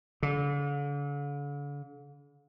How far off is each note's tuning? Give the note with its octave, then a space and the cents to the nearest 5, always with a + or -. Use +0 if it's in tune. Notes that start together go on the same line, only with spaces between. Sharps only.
D3 -40